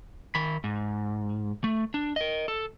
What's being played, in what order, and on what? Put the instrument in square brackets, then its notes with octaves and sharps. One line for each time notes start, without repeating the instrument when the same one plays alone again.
[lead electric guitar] D#3 B5
G#2
A3
D4
A#4 D#5
A4